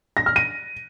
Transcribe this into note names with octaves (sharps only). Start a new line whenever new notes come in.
A#6
F6
D#7